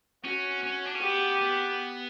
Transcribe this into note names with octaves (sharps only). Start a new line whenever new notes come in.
C#4 F#4
C#4
D4
C#4
B3 G4
B3